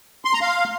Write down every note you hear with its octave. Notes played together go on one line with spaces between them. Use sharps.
C6
A#5
F5